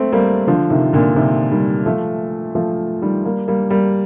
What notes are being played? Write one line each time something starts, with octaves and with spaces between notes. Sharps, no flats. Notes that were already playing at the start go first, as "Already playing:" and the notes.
Already playing: A3 C4
G3 A#3
D3 F3
C3 D#3
A#2 D3
C3 D#3
D#3 G3
F3 A3
F3 A3
D#3 G3
G3 A#3
G3 A#3
G3 A#3